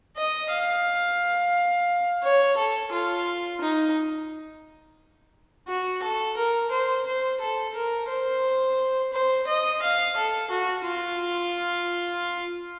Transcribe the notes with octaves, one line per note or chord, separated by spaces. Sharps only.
D#5
F5
C#5
A4
F4
D#4
F#4
A4
A#4
C5
C5
A4
A#4
C5
C5
D#5
F5
A4
F#4
F4